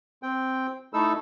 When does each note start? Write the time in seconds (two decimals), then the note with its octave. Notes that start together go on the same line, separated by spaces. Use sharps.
0.23 C4 G5
0.94 A3 D#4 E4 A4 E6